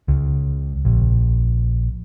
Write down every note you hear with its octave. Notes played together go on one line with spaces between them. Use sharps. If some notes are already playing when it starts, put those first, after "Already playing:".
C#2
A#1